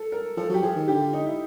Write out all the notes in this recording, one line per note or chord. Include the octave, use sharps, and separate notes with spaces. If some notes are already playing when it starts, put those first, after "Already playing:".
Already playing: A4
A#4
F3 A4
F#3
G4
F3 G#4
D#3
D3 G4
F4
D#4
E4